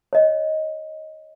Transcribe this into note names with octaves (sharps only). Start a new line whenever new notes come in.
C#5 D#5